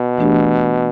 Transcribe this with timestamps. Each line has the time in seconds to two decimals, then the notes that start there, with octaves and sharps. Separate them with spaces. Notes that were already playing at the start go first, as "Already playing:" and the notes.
Already playing: B2
0.18 E3 A3 D4 G4